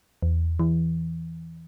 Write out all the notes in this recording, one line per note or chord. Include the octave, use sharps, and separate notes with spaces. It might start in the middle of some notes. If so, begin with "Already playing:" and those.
E2
E3